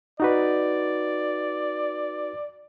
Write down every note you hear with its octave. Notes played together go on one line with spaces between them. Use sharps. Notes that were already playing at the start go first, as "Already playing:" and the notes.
D#4 F#4 B4 D5